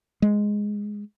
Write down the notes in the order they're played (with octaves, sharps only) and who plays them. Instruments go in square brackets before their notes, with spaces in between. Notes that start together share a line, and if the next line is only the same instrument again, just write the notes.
[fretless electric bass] G#3